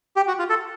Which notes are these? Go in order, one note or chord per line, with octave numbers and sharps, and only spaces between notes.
G4
F#4
F4
A4